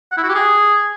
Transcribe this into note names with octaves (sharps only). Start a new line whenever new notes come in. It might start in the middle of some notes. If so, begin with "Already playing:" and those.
F#5
E4
F#4
G4
G#4